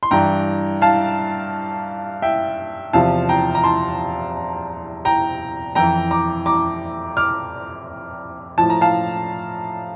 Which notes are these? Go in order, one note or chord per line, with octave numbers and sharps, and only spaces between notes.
C6
G2 E3 G5 A#5
F5 A5
E5 G5
E2 C3 F3 F5 A5
G5 A#5
A#5
A5 C6
G5 A#5
F2 E3 G5 A#5
A#5 D6
A#5 D6
D6 F6
A2 F3 A5
A#5
F5 A5